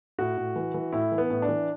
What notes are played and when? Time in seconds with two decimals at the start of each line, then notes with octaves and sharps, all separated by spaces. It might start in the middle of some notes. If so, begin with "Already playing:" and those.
0.18 A2 F#4
0.37 A2
0.56 E3
0.74 E3
0.93 A2 E4
1.12 E3
1.18 B3
1.30 A2
1.42 D4
1.49 E3